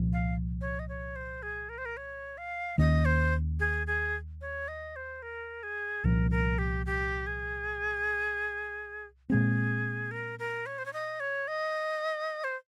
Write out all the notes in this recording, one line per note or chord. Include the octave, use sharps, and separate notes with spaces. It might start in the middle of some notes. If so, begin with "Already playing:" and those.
Already playing: C2 A#2 F3
F5
C#5
D#5
C#5
C5
G#4
A#4
C5
A#4
C#5
F5
D#2 D#3 A#3 C#4 D#5
C5
G#4
G#4
C#5
D#5
C5
A#4
G#4
C2 A#2 F3 A#4
A#4
G4
G4
G#4
A#2 G#3 C4 G#4
A#4
A#4
C#5
C5
C#5
D#5
C#5
D#5
C5